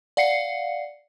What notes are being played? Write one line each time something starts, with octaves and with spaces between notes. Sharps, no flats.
D5 F5 F#5 C7 C#7